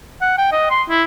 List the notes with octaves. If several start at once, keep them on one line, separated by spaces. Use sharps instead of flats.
F#5
G5
D#5
C6
E4